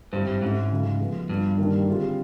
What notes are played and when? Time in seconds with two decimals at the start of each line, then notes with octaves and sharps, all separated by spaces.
0.12 G2 G3 C4 E4 G4 C5
0.27 G2
0.42 G#2 A3 C#4 E4
0.71 C#3 F#3 A3
1.00 F3 G#3 B3
1.29 G2 B3 D4 F4
1.58 D#3 G3 A#3 D4
1.87 D3 G3 C4 F4 G#4